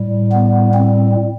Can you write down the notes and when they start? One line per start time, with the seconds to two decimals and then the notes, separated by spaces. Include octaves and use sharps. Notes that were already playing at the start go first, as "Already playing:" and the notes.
Already playing: A2 G3
0.32 B3
0.74 C4